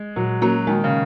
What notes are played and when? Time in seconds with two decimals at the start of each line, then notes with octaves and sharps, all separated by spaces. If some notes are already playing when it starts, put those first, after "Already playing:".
Already playing: G#3
0.16 A#2 F#3
0.42 F#3 A#3 C#4 F#4 A#4
0.67 D#3 G#3
0.84 C#3